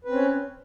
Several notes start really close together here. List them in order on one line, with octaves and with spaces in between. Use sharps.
B4 C4 C#4